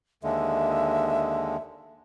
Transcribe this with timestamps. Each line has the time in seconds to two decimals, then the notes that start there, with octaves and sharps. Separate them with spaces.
0.23 D#2 D3 G#3 E5